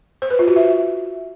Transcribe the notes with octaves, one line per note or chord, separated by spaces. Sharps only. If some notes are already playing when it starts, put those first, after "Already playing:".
C5
B4
F4
F#4
E5